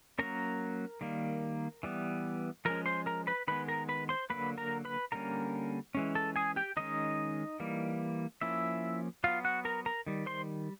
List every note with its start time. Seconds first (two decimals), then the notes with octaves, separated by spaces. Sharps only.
0.19 F#3 A#3 C#4 A#4 A#5
1.01 D#3 G3 A#3
1.83 E3 G3 B3
2.65 F3 G#3 C#4 A#4 A#5
2.86 C5 C6
3.06 A#4 A#5
3.27 B4 B5
3.48 D#3 G#3 B3 B4 B5
3.68 A#4 A#5
3.89 B4 B5
4.09 C5 C6
4.30 D3 F#3 A#3 B4 B5
4.58 A#4 A#5
4.85 B4 B5
5.12 D3 G3 A#3 C#4 A#4 A#5
5.95 E3 G#3 C#4
6.15 A4 A5
6.36 G#4 G#5
6.56 G4 G5
6.77 D#3 G#3 C#4 D#4 D#5
7.60 E3 G3 A#3
8.41 F3 A#3 C#4 E4 E5
9.24 F#3 B3 F4 F5
9.45 F#4 F#5
9.65 A#4 A#5
9.86 A#4 A#5
10.07 D#3 G3
10.26 C5 C6